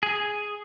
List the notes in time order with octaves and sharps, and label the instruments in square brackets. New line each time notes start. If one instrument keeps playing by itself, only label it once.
[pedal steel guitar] G#4